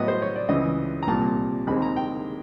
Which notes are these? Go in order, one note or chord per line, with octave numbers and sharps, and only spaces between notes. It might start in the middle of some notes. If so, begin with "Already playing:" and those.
Already playing: A2 F#3 B3 D#5
C5
C#5
D5
C#2 C#3 E3 D#5
A#5
C2 A#2 G3 A#3 A5
D#2 D#3 G#3 C4 B5
A#5
G5